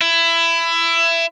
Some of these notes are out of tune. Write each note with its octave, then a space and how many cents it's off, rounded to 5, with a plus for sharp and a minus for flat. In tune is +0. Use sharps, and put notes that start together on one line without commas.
E4 +20